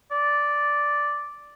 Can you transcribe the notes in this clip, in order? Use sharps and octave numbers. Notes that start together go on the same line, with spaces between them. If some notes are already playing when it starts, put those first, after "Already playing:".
D5